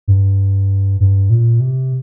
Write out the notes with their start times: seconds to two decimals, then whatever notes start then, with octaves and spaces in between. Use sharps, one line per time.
0.08 G2
1.00 G2
1.30 A#2
1.60 C3